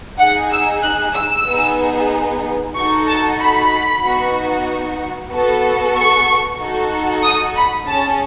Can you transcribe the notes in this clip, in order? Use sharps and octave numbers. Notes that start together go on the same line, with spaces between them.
D#4 G#4 F#5
E6
F#6
E6
B3 D#4 G#4
D#4 F#4 A4 C#6
A5
B5
B3 D#4 F#4
B3 F#4 A4
C#6
D#4 F#4 A4
D#6
B5
C#4 G#4 A5